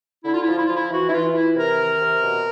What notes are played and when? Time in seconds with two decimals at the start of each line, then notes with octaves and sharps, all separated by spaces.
0.24 D3 E4
0.32 F4
0.41 E4
0.47 F3 F4
0.58 E4
0.66 F3 F4
0.75 E4
0.90 E3 F#4
1.08 E4
1.13 E3 F4
1.34 E3 E4
1.56 C3 A#4
1.78 D#3
2.01 C3
2.23 B2